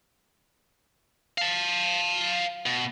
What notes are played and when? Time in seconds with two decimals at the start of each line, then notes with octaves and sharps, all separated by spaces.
1.38 F5 A5
2.66 B2